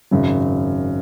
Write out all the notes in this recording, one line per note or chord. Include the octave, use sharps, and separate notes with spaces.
G#1 F#2 C#3 F#3